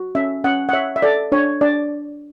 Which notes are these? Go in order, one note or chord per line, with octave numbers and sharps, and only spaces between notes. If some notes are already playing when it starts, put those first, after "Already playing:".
Already playing: F#4
C#4 E5
C#4 F#5
F#5
C#5 E5
E5
A4 D5
D4 C#5
D4 D5